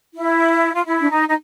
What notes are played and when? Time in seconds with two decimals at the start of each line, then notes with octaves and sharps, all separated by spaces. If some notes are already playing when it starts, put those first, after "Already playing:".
0.14 E4
0.74 F4
0.86 E4
1.01 D4
1.10 D#4
1.28 D#4